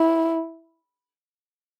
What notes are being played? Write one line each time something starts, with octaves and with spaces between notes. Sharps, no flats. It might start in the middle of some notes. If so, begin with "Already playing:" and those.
Already playing: E4